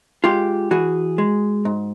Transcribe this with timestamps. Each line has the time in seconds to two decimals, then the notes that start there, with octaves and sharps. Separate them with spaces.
0.24 G#3 F4 G4
0.71 E3 F#4 G#4
1.18 G#3
1.65 G#2